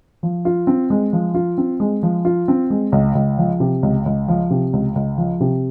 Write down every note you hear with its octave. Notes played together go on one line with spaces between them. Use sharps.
F3
F4
C4
G#3
F3
F4
C4
G#3
F3
F4
C4
G#3
C#2
C#2
F3
C3
C#2
C#2
F3
C3
C#2
C#2
F3
C3